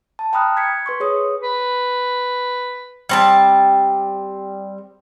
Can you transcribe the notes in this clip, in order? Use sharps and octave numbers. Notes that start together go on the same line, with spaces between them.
A5
G5 A#5 B5 D#6 F6 F#6
G#6 B6 C#7
B4 C6 C#6
G#4 C#5 D#6
B4
G3 C4 A5